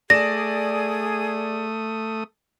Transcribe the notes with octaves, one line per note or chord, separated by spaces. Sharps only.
A3 G#4 D5 D#6 A#6 E7